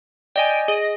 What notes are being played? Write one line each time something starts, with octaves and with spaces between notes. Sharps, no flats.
D5 D#5 G5 G#5
G#4 D#5